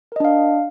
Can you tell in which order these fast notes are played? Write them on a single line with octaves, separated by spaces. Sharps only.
A#4 D#5 D4 F5